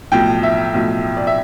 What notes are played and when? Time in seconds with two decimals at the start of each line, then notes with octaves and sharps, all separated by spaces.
0.11 B1 A2 F3 G5
0.43 E5
0.74 B1 A2 F3
1.17 D5
1.27 E5